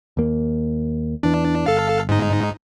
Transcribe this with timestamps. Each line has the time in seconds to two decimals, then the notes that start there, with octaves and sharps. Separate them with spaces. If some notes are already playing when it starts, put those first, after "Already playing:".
0.17 D#2 A#3
1.23 E2 E3 D4
1.66 G1 A4 F5
2.09 G#2 D#4